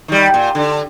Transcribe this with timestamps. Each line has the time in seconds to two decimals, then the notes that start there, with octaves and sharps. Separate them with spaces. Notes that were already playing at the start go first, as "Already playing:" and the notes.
0.08 D#3 G3
0.34 A#2
0.55 D3